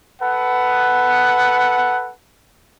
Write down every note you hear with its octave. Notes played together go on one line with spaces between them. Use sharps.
A4 B4 F#5